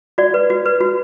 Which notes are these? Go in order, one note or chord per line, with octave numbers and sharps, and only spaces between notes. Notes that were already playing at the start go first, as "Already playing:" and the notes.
F#4 D5
B4
F#4
B4
F#4